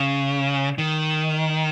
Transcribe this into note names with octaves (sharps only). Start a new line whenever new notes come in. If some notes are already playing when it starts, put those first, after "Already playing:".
Already playing: C#3
D#3